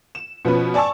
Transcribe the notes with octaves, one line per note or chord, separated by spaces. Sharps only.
E7
B2 F3 C#4 B4
D5 G#5 A5 C#6 E6